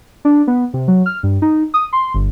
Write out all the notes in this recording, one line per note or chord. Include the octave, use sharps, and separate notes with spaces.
D4
B3
C3
F#3
F6
G2
D#4
D#6
C6
G1